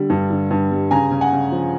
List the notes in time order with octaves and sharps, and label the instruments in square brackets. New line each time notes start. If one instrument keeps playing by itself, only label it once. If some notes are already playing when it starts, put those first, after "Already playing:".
Already playing: [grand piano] D3 G3
G2
D3
G2
G3
C#3 G#5 A#5
C#3
F#5 G#5
C#3
F3